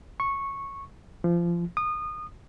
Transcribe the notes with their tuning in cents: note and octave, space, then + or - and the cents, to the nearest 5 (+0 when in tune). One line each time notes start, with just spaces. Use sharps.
C#6 -10
F3 -25
D#6 -25